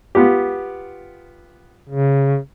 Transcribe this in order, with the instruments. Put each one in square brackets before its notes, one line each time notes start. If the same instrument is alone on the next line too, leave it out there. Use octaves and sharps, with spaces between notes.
[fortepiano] B3 F4 G4
[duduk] C#3